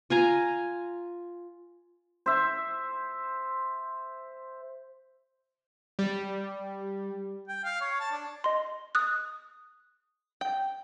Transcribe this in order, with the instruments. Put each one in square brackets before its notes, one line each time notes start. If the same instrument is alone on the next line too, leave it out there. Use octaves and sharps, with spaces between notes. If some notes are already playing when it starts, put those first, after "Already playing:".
[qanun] F4 G#5 A#5
[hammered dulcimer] C5 E5
[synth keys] G3
[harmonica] G5
F5
C#5
A5
D4
[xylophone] D#5 C6
D#6 F#6
[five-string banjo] G5